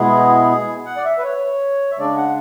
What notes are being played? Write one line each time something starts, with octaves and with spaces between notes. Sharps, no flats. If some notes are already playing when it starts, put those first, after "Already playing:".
Already playing: B2 G#3 B3 E4 G#4
F#5
D5
E5
B4
C#5
E5
C#3 G#3 D4 D5
F#5